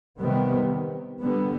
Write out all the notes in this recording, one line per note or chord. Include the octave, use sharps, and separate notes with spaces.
C3 D#3 G3 B3
D3 G3 B3